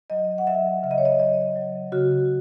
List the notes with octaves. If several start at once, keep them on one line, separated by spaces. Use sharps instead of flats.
F#3 D#5
F#5
F#3 E5
C#3 E5
D#5
C#5
D#5
F#3 D#5
F#3
C#3 F#4